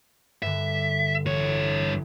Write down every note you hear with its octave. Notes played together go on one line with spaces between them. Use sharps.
G2 D3 E5
A1 G2 C#5